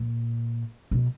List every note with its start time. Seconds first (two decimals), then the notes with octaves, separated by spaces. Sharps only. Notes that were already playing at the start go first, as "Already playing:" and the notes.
Already playing: A#2
0.91 B2